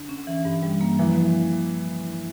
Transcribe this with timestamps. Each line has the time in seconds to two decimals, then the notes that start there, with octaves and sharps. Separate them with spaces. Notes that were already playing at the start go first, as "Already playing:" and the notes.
Already playing: D3
0.09 C#4
0.27 E3
0.45 G2
0.63 G3
0.81 A#3
0.99 E3 F3